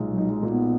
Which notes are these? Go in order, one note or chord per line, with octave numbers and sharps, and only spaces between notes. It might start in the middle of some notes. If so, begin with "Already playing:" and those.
Already playing: B1 A#2 G#3 D#4
F#3
D#4
G#3
A#2
B3